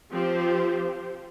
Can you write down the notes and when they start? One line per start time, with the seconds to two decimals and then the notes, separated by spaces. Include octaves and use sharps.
0.12 F3 C4 G4 C5